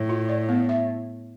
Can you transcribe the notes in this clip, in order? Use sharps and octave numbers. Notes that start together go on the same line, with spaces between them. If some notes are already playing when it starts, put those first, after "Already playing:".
Already playing: A2
F4
D5
B3
E5